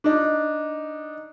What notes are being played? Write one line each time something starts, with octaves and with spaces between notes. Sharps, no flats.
D4 D#4